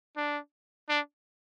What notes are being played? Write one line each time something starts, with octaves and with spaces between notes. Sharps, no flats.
D4
D4